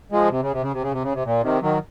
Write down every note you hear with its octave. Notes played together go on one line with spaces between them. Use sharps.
F3 G#3
C3
C#3
C3
C#3
C3
C#3
C3
C#3
C3
A#2
C3 D#3
D#3 F#3